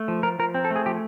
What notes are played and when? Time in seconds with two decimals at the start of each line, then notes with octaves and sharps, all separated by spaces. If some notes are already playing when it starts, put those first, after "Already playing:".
Already playing: A3
0.08 F3
0.23 F3 A#4
0.39 F3 A#4
0.54 C4
0.65 A4
0.71 A3
0.76 G#4
0.86 F3 G4